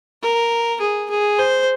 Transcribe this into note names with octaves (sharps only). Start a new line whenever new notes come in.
A#4
G#4
G#4
C5